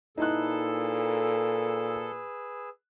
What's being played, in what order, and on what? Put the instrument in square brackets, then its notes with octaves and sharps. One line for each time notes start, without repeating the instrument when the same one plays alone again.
[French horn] A#2 [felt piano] D#4 E4 F#6 [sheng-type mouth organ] G#4 B4 E6 [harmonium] A4